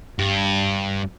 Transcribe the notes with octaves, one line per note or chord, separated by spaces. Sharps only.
G2